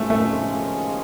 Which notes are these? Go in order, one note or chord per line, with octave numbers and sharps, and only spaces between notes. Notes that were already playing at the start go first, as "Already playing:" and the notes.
Already playing: D#2 C#3 F3 G#3 A3 C#4
A3